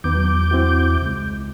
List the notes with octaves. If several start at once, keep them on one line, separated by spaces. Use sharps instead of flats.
E2 D#3 B3 D6 G6
F#3
C4 E4 F#4
C#2 G#3